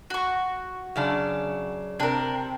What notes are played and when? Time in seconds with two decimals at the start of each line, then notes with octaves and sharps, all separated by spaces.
0.10 F#4 C#6
0.96 F#2 C#3 D4
2.00 C3 D4 A#4